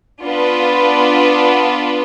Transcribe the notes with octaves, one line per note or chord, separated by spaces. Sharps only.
B3 D4 F4 B4